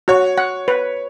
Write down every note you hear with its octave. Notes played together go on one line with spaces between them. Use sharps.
F#4 C#5
F#5
B4